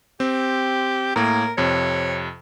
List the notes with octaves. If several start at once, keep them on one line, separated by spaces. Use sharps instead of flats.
C4 G4
A2 A#3 A#4
F2 C3 C#5